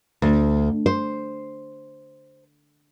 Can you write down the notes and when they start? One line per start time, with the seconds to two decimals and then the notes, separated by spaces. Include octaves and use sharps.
0.22 D2
0.86 C5